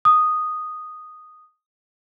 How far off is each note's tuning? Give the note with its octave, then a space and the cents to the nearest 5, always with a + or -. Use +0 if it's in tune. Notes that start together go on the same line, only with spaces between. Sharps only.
D#6 -5